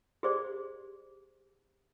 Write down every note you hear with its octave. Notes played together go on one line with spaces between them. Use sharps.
G4 G#4 C5 D5